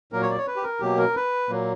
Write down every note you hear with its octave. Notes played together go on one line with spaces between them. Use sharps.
A#2 F#3 A#3 A#4
C#5
D5
C#5
B4
G4
A#4
B2 F#3 A#3 G4
A#4
B4
A#2 F#3 A#3